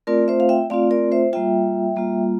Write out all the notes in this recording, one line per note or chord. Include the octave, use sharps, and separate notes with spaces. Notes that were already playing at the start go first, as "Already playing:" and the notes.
A3 C4 F4 A#4 D5
C5 E5
F5
E5 G5
A3 C4 F4 D5 F5
A#4 D5
C5 E5
G3 A#3 F4 E5 G5
G3 A#3 F4